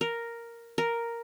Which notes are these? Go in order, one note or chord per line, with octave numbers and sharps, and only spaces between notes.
A#4
A#4